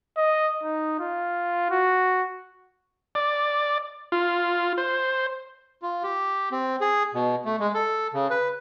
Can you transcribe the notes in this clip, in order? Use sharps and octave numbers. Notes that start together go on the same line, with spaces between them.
D#5
D#4
F4
F#4
D5
F4
C5
F4
G4
C4
G#4
B2
A3
G#3
A4
C#3
B4